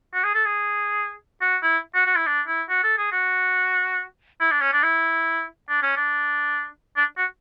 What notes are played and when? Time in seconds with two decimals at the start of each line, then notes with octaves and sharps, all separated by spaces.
0.14 F#4
0.24 G#4
0.35 A4
0.45 G#4
1.41 F#4
1.63 E4
1.95 F#4
2.06 F#4
2.16 E4
2.26 D4
2.48 E4
2.69 F#4
2.84 A4
2.98 G#4
3.12 F#4
4.41 E4
4.51 D4
4.61 C#4
4.73 D4
4.83 E4
5.69 D4
5.83 C#4
5.97 D4
6.97 D4
7.18 F#4